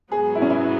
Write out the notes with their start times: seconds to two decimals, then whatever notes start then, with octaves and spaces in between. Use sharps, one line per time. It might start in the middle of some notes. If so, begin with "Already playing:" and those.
0.12 G#2 F#3 B3 G#4
0.35 E4
0.42 C#4
0.50 E4